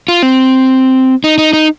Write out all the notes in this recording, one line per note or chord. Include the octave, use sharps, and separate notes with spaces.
F4
C4
D#4
D#4
D#4